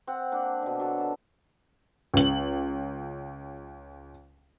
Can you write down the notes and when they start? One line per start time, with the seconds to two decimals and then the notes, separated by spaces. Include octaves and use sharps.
0.07 C4 F#5
0.32 A#3 D4 F#5
0.62 B2 D3
0.80 F#3 A4
1.00 A4
2.14 C#2 F#7